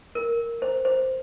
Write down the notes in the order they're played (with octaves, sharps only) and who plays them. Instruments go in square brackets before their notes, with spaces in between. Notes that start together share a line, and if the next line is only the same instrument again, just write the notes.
[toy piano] A#4
C5
C5